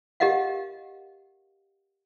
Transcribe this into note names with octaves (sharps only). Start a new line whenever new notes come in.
G4 A#4 D#5 F5 F#5